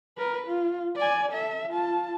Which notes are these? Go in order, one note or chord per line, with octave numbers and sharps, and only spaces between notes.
A#4 B4
F4
D5 G#5
A4 E5
F4 A5